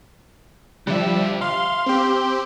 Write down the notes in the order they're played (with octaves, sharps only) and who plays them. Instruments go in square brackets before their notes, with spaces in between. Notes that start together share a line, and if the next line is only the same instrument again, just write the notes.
[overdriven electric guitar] D3 E5 [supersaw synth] F3 G3
[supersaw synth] F5 [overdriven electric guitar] C6
[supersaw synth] C4 G4